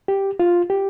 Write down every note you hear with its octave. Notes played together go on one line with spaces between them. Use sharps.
G4
F4
G4